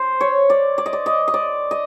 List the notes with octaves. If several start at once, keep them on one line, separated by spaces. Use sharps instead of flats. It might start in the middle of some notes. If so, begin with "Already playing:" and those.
Already playing: C5
C#5
D5
D5
D#5
D5
D#5
D#5
D5
D#5